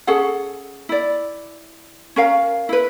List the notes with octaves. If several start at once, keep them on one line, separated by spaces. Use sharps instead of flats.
C#4 G#4 A4 F#5
E4 D5
C#4 A#4 F5
E4 B4